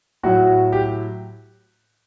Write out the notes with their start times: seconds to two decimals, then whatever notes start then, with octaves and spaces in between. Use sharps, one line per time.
0.23 A2 F#3 F#4
0.73 G4